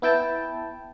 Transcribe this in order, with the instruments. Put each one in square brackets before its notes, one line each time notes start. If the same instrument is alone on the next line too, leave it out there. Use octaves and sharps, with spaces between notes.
[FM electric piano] B3 E4 G5 A5